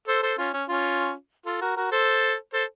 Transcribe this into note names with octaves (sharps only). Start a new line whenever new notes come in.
A4 C5
A4 C5
C#4 F4
C#4
C#4 F4
F4 A4
F#4 A#4
F#4 A#4
A4 C5
A4 C5